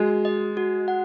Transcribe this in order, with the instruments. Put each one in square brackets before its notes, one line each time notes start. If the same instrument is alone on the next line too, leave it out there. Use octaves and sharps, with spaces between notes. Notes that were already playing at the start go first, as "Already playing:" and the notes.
Already playing: [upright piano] G#3 [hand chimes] F#4
[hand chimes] D#5
F#4
F#5